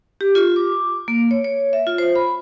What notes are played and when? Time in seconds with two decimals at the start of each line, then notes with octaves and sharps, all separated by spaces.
0.21 G4
0.35 F4
0.56 D6
1.08 A#3
1.31 C#5
1.44 C#5
1.73 E5
1.87 F4
1.98 C5
2.16 B5